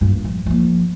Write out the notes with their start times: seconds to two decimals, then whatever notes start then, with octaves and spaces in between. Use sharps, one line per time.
0.01 G2 A#2
0.25 F3
0.46 F3 A#3